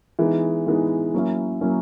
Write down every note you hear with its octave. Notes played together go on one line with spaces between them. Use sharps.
E3 G#3 B3 D#4
E3 G#3 B3 D#4
F#3 A#3 C#4 E4
F#3 A#3 C#4 E4